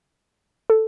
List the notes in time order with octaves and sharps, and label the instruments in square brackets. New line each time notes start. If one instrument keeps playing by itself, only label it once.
[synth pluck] A4